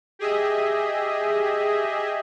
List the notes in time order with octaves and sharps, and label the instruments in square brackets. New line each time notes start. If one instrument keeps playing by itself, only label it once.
[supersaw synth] G4 G#4 D#5 E5